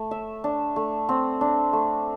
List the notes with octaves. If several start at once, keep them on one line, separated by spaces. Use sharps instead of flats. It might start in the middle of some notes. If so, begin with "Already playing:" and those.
Already playing: A3
E5
D4
A3
C4
D4
A3